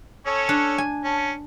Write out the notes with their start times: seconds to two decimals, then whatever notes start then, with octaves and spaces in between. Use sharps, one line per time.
0.26 C#4 A4 C#5
0.49 D4
0.78 G#5
1.04 C#4 A5